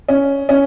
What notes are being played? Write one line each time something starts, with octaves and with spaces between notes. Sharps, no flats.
C#4
C#4